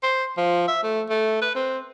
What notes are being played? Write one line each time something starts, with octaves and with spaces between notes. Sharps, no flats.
C5
F3
E5
A3
A3
B4
C4